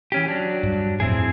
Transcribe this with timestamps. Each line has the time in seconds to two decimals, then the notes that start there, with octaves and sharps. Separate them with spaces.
0.12 E3 C#4 G4
0.28 F#3 D4
0.63 G2
1.00 F2 A2 C4 E4 G#4